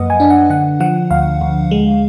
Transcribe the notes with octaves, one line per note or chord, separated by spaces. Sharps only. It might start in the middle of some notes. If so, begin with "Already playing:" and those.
Already playing: F#2 F3 A#3 B4 D#5 F#5
G#5
D4
F#5
D3 F#5
F3 F#5
D2 F5
D2
G#3